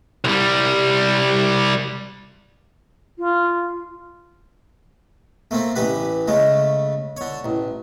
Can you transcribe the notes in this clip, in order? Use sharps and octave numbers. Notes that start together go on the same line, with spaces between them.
C2 G3
F4
A3 A#3 C4
A1 E3 G4 B4
C#3 G#3 A3
D3 C#5
A1